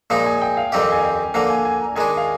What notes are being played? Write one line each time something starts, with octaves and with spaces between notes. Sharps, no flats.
A#2 F3 G#3 D#4 F5
G#5
G5
F5
F2 D#3 G3 C4 G4 F5
G#5
G5
D3 F3 A#3 F5
G#5
G#5
A#5
D#3 G#3 D4 G#5
F5